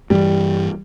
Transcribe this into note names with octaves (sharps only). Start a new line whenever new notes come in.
G2 E3 G3